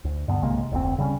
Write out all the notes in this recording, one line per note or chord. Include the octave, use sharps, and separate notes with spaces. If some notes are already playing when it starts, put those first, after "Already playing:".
D2
G2 D3 B3
B1 C3 G#3 A#3
F1 D2 A#2 C4
C#3 G3 C4 C#4